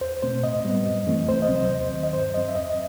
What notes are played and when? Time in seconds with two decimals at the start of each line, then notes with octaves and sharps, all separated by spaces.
0.01 E2 C5
0.22 B2 A3 C4 C5
0.43 A2 D#5
0.64 G3 B3
0.87 F#2
1.07 E3 A3 C4
1.28 C2 C5
1.42 D#5
1.49 C3 F#3 C4
1.56 C5
1.71 D#2
1.92 D#3 F#3
2.03 D#5
2.13 G2 C5
2.34 F#3 C4 D#5
2.48 E5
2.55 E2 D#5